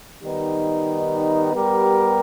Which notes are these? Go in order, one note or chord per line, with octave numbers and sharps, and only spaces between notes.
D#3 G3 B3 D#4
G3 B3 G4 A#4